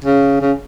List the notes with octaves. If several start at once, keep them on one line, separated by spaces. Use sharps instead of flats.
C#3
C#3